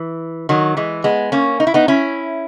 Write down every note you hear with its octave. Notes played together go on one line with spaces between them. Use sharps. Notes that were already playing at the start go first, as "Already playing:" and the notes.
Already playing: E3
D#3 F#3
E3 G#3
G#3 B3
A#3 C#4
D#4
E4
B3 D#4
C#4 E4